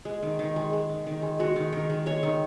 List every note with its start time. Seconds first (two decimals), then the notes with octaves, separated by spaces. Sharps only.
0.05 G#3
0.23 D#3
0.39 D#3
0.56 G#3
0.73 G#3
0.89 D#3
1.07 D#3
1.22 G#3
1.39 G#3 F#4
1.56 D#3
1.72 D#3 A#4
1.90 G#3
2.06 G#3 C#5
2.23 D#3